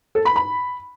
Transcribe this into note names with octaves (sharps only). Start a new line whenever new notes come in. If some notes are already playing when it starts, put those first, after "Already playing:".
A4
B5
B5